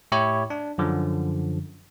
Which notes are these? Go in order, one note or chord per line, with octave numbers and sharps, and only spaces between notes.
A2 E4 G4 C#5
D4
F#2 D3 F3